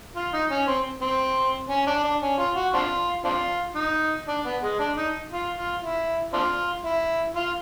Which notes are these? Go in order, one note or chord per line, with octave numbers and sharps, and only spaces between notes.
F4
D#4
C#4
C4
C4
C#4
D4
D4
C#4
F4
F#4
C4 D4 F4
C4 D4 F4
D#4
D4
B3
G#3
D4
D#4
F4
F4
E4
C4 D4 F4
E4
F4